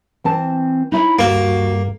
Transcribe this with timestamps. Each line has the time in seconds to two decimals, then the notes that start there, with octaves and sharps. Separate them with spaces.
0.24 E3 C4 A5
0.92 D#4 E4 C#5 B5
1.19 D2 G2 G3 A#3 F#4